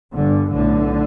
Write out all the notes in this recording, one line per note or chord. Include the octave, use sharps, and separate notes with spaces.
G1 G2 D3
B1 A2 D3